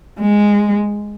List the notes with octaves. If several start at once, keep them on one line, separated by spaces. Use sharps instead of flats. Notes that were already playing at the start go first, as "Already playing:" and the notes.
G#3